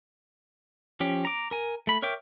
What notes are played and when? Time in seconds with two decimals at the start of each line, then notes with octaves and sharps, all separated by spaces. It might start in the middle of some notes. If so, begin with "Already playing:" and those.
1.00 F3 C#4 G4
1.25 A#5 D6
1.51 A#4 G#5
1.87 A3 B5
2.02 A#4 C#5 E5 G5 D6